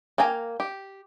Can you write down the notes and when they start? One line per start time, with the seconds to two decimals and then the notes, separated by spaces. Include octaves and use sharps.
0.18 A#3 G5 G#5 A#5
0.60 G4